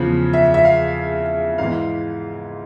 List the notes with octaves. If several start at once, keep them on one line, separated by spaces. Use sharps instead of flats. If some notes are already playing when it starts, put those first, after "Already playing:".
Already playing: E2 C#3 F3
E5
E5
F5
G#2 E3 F5